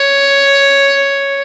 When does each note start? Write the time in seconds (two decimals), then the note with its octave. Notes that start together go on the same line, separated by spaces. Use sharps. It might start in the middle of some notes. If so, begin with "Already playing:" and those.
Already playing: C#5